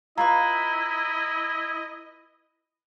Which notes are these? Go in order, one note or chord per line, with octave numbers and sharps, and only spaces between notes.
E4 F4 B4 D#5 A#5 C#6